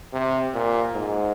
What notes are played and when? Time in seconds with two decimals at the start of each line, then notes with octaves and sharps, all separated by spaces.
0.13 C3
0.54 A#2
0.94 G#2